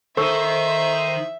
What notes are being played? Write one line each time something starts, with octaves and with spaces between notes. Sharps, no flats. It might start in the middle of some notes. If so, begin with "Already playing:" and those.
D#3 A4 C5 E5 C#6 E6